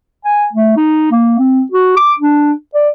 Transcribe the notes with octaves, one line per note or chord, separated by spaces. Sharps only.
G#5
A3
D#4
A#3
C4
F#4
D6
D4
D5